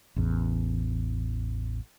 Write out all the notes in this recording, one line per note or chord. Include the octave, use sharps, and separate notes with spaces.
A1 E2